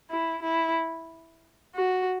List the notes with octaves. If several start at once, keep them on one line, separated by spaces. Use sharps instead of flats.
E4
E4
F#4